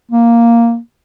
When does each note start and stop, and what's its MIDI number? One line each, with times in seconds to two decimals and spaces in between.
0.11 0.78 58